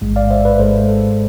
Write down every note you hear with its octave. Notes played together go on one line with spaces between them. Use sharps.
A1 G#2 G#3
D5 F5
C5 E5
B4 D5
G#1 G#2 G#3 A4 C5
A4